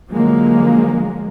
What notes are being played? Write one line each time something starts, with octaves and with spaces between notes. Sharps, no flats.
D3 F3 F#3 G#3 A#3